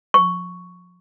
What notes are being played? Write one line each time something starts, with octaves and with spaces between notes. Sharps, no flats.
C#6